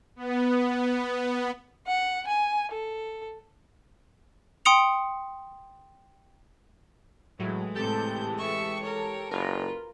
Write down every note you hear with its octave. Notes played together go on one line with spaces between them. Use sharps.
B3
F#5
G#5
A4
G5 C6 D#6 C#7 F7
A2 E3 F#3 G#3
A2 C3 G4 A4 A5 G6
E5 C#6
A#4 C#5
F#1 F4 A#4 B4